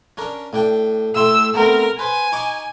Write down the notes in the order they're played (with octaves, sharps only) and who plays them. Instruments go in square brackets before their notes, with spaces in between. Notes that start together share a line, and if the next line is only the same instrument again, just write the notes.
[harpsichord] C#4 D4 A#4
A2 D4 G5
[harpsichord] A2 A3 C6 [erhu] E6
[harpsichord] A3 B3 C4 [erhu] A#4
[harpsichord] B4 C5 [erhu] G#5
[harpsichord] D#4 C#6 D6